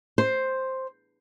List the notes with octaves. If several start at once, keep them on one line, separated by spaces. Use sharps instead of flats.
C5